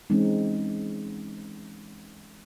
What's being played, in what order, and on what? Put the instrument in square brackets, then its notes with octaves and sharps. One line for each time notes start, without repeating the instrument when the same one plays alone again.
[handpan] E3 G#3 C4 C#4 D#4